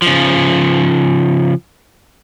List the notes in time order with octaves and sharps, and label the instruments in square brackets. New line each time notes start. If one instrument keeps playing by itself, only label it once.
[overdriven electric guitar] C#3 F3